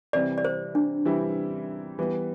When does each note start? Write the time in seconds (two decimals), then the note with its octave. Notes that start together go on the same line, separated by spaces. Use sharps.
0.13 C3 E3 G3 C4 E4 D5
0.38 D5
0.45 C5
0.75 D4
1.05 C3 E3 G3 C4 E4
1.99 E3 G3 B3